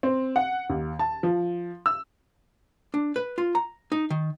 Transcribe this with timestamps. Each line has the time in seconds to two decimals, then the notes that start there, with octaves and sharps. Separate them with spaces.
0.03 C4
0.36 F#5
0.70 D#2
0.99 A5
1.23 F3
1.86 E6
2.94 D4
3.16 B4
3.38 F4
3.55 A#5
3.92 D#4
4.10 D#3